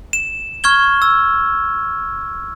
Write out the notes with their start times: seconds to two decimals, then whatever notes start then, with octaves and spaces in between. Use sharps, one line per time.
0.13 E7
0.64 C#6 F6 G#6 G7
1.02 E6